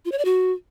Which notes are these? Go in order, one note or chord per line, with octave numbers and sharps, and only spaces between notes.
F4
C#5
D5
F#4